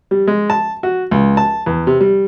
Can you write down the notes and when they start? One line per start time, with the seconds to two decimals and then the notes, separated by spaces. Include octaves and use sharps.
0.11 G3
0.28 G#3
0.50 A5
0.83 F#4
1.11 C#2
1.37 A5
1.66 E2
1.87 C3
2.01 G3